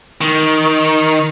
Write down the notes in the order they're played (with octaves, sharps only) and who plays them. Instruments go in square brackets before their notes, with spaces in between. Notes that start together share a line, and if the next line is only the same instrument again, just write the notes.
[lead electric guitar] D#3